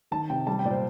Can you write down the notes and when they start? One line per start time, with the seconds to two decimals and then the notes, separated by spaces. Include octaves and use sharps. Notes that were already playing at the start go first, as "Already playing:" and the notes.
0.11 D#3 A5
0.30 C3 G5
0.47 G3 A5
0.59 G5
0.65 A#2 D5
0.71 C5